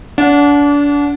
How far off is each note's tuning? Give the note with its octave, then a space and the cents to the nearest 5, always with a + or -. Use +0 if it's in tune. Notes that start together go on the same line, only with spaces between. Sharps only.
D4 -30 F#5 -15